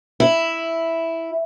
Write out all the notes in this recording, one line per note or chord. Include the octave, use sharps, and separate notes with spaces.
E4